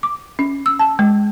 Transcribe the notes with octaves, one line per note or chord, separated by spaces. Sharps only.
D6
C#4
E6
A5
G#3